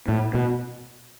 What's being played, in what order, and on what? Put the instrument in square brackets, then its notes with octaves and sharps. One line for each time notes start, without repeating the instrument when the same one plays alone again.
[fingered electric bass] A2
B2